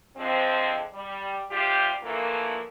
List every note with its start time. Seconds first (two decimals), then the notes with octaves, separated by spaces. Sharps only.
0.16 D3 F3 G#3 C4
0.93 G3
1.51 C3 G3 F4 G4
2.02 D3 E3 F3 A3 A#3